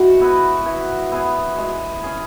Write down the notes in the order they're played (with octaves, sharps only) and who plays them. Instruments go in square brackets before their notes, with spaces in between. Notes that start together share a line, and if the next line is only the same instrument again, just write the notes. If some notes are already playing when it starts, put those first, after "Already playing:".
Already playing: [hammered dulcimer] E3 G#3 [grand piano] F#4
[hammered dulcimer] B3 E4 B4
E3
B3 E4 G#4
G#3
C#4 G#4